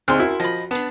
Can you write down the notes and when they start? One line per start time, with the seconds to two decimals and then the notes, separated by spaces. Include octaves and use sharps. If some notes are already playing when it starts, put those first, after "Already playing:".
0.08 D2 C4 D#4 G#4 C6 F6
0.20 E4 F#4 A#4
0.40 F3 D#5 B5
0.71 B3 D4 A5